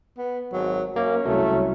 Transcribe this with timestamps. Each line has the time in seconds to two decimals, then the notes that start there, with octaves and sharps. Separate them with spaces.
0.18 B3
0.53 G#1 F#3
0.96 F#2 A#3 C#4
1.25 C2 F#3 A3